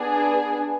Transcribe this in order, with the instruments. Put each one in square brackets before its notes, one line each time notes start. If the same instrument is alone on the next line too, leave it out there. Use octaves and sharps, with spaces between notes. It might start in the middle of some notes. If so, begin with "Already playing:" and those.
Already playing: [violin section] B3 D4 G#4